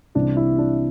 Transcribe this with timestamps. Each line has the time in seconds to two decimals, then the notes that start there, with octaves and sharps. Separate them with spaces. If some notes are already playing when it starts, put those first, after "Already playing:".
0.15 C2 C3 E3 D4
0.37 E4
0.58 D4